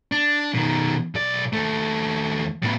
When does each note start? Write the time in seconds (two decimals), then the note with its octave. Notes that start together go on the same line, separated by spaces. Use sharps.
0.12 D4
0.54 B2 D#3
1.15 B1 D5
1.53 D#2 A3
2.63 A2 B3